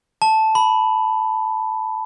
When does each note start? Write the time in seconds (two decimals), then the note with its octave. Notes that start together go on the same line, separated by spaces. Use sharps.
0.22 A5
0.55 B5